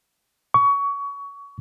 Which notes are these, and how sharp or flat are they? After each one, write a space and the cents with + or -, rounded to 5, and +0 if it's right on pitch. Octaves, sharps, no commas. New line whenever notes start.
C#6 +25